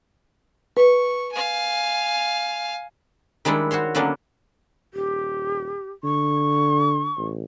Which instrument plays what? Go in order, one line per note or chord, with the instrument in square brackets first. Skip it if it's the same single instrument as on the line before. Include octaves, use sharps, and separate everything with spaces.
[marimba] B4 [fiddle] C#6
[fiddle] F5 G#5
[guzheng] D#3 G3 G#3 D4 E4
F#4 C5 C#5 C6
D3 F#3 A#3 B3 C#4 D4
[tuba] D#1 [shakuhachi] G4
[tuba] D3 [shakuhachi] C#6
[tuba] A1